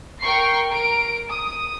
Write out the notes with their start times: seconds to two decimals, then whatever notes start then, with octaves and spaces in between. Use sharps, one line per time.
0.21 A#4 G5 C#6 C7
0.71 A#4 D7
1.29 D#6